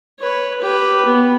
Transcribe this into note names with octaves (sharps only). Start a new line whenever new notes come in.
B4 C#5
G4 B4
B3